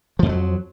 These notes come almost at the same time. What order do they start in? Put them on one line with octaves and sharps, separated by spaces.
F3 F2 A3 F#3